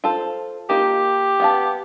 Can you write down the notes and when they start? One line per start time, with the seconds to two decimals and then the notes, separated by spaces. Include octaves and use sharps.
0.04 F4 A4 C5
0.69 A#3 D#4 F4 G4
1.40 B3 F5 A5